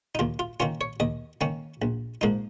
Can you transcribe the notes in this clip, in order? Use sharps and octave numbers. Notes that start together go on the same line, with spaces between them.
D#4
D#2 F4
F4
D#3 A#3 C#4 F4
C#5
D#2 D#5
D#3 A#3 C#4
A#1
G#2 F3 A#3 D#4